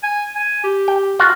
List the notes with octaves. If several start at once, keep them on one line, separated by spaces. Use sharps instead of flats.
G#5
G#5
G4
G5
F4 F#4